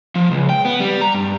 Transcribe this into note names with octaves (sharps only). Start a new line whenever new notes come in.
F3
C#2
G5
B3
G3
A#5
G2